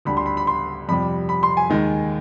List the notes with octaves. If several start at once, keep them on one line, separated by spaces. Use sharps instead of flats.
D2 D3 G3 B5
C6
B5
B5
C6
F2 C3 G3 B5
B5
C6
G#5
D#2 D#3 G#3